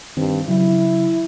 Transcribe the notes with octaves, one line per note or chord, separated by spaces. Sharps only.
G2 D#3 C4
C#3 F#3 E4